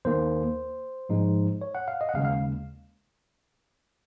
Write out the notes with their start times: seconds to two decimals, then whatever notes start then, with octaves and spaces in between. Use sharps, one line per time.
0.05 D#2 D#3 A#3 C5
1.09 G#2 F3 G#3 D#4
1.61 C#5
1.75 F#5
1.88 F5
2.01 D#5
2.09 F#5
2.14 D#2 C#3 G#3 F5
2.25 F5